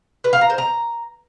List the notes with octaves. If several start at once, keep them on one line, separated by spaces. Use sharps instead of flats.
B4
F5
A#5
C5
A#5